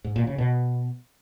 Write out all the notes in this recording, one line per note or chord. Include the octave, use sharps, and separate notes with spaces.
G#2
A#2
C#3
B2